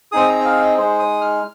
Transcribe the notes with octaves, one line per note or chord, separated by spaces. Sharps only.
C4 D#4 G#4 D#6
A#5
D#5
F5
D#5
G#3 D#4 G#4 C5
D#6
F6